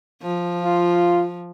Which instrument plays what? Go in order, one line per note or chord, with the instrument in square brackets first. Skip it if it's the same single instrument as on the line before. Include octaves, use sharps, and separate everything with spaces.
[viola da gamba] F3
[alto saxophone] F4